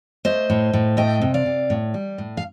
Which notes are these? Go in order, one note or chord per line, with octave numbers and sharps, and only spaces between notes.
A3 C5 D#5
A2
A2
A3 D#5 G5
C3
D5 F5
C3
A2
G3
A2
F5